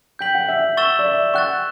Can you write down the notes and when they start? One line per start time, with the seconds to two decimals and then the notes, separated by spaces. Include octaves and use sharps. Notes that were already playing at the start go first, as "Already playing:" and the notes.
0.19 G5 G6 B6 F#7
0.35 F#5
0.48 E5
0.77 C#6 E6 A6 E7 G7
0.99 D5
1.06 E5
1.34 F#5 C#6 F#6 A6